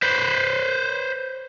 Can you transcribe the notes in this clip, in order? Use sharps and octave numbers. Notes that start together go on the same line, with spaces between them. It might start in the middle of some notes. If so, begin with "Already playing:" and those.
B4 C5